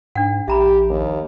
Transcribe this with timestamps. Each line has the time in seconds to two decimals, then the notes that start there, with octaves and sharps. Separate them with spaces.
0.15 G#2 D4 F#5
0.48 A#1 G4 E5 A#5 B5
0.89 D#2